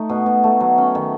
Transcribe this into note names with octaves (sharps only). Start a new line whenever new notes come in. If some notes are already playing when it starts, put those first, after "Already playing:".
Already playing: A3 D#4
B2
B2
A3
F#3
C#4
D#3